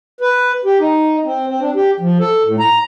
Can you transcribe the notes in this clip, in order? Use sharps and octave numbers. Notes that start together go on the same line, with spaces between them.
B4
G4
D#4
C4
C4
D4
G4
F3
A4
A2
A#5